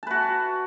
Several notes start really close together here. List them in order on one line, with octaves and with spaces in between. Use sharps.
A5 B4 F#4